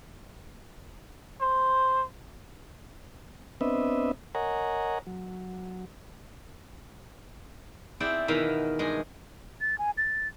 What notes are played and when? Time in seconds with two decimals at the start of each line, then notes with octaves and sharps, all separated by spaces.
1.41 C5
3.61 B3 C4 D4 B4 D#5 E5
4.35 A#4 C#5 D#5 F#5 G#5 A#5
5.07 F#3
8.00 C4 E4 G#4 D5 F#5 G5
8.28 E2 B2 D#3 E3 G#4 F5
8.79 G2 G#3 G#4 G#5
9.61 A6
9.78 G#5
9.97 A6